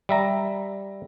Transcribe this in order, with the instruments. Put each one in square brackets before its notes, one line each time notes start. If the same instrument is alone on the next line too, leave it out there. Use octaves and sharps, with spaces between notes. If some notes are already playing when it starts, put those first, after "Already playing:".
[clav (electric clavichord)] G3 E5 A#5